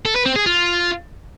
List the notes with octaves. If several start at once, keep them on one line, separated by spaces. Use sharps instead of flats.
A4
B4
C4
G#4
F4